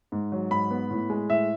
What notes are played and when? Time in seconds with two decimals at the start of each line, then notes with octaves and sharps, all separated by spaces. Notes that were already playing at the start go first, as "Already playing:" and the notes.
0.12 G#2
0.32 F#3
0.51 G#2 B5
0.71 B3
0.91 A2
1.10 G#3
1.30 A2 E5